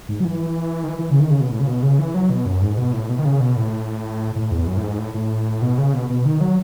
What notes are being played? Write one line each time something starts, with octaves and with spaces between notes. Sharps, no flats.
G#2
F#3
E3
D#3
E3
E3
C#3
D#3
C#3
B2
A2
C#3
B2
C#3
E3
F#3
B2
F#2
G#2
B2
A2
B2
D#3
C#3
B2
A2
A2
E2
F#2
A2
G#2
A2
A2
B2
C#3
B2
B2
D#3
F#3